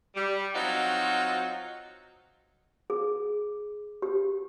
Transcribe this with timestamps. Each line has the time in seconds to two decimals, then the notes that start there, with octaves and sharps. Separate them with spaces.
0.16 G3
0.55 F#3 C4 D#4 F4 F#4
2.90 G#4
4.02 G4